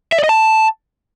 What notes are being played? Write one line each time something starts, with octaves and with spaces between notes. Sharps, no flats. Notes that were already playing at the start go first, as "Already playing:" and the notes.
E5
D5
D#5
A5